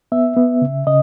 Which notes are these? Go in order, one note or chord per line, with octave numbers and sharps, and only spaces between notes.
B3 E5
B3
C#3
C#3 D#5